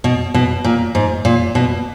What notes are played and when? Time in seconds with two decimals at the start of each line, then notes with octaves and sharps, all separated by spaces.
0.04 B2
0.34 B2
0.64 A#2
0.95 G#2
1.25 A#2
1.55 B2